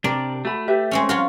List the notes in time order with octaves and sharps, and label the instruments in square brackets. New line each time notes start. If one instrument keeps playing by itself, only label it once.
[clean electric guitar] C3 D4 [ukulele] A#4 [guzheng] D5
[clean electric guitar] A3 [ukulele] F#4 B5
[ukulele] G4 B4 E5
[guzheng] G#3 C4 C#4
[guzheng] F#3 F4 F#4 [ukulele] A#4